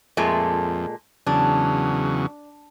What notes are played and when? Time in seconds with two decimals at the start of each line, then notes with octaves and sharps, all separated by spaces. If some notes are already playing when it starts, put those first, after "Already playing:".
0.17 F2 A#2 G#3 A3
1.27 E2 C#3 F#3 D4